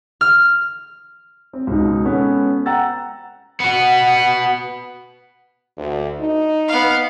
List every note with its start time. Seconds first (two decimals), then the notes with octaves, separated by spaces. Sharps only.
0.21 F6
1.53 C4
1.67 C#2 B2 D#4
2.05 G#3 B3 C#4 A4
2.66 F#5 G5 A#5 E6 A6
3.60 B3 F#4
5.77 D2
6.20 D#4
6.68 B3 F5